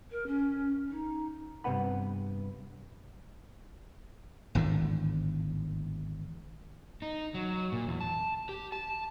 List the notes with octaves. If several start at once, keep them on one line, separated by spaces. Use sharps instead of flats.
A#4
C#4
D#4
G2 C3 B3 B4 F#5 B5
G#1 E2 A2 D3
D#4
F#3
A#2
E2
A5
G4
A5